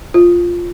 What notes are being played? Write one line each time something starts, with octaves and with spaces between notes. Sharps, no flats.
F4